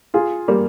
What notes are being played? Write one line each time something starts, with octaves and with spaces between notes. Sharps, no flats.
F4 G#4
G3 A#3